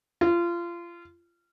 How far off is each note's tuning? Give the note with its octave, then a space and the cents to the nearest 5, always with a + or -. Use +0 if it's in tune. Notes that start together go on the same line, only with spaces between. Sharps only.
F4 -25